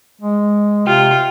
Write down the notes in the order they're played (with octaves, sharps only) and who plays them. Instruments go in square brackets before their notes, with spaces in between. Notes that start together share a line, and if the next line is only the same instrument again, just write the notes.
[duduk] G#3
[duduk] C3 [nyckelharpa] F4 [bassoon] G4